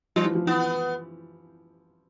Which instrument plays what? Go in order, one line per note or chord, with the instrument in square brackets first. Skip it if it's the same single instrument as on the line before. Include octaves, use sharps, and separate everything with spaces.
[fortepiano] F3 [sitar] G3
[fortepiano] E3
F3
[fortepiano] E3 [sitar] B3